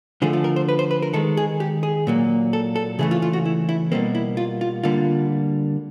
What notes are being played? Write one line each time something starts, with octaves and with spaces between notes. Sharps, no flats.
D3 F3 A3 G#4
F4
A#4
C5
B4
C5
B4
A#4
D#3 G#3 A4
G#4
G4
G#4
A#2 F#3 A#3
A4
A4
C#3 E3 A3 G#4
F4
F4
F#4
E4
E4
B2 G3 A#3 C4
E4
F4
F4
D3 G3 A#3 F4